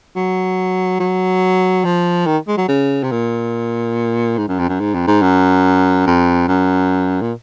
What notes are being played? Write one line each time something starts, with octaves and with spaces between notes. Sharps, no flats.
F#3
F#3
F3
D#3
G#3
F#3
C#3
C3
A#2
G#2
F#2
F2
F#2
G#2
F2
G#2
F#2
F2
F#2
A#2